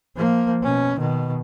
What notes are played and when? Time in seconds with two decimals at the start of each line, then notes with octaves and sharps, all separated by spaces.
0.16 F3 A#3
0.62 B2 C#4
0.98 B2 D#3